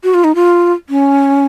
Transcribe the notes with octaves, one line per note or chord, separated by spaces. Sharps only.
F#4
F4
D#4
F4
C#4